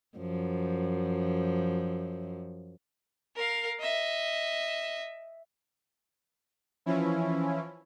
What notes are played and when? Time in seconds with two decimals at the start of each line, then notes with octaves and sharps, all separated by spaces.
0.18 F#2 F3
3.36 A#4 F5
3.80 D#5 E5
6.86 E3 F3 C#4 E4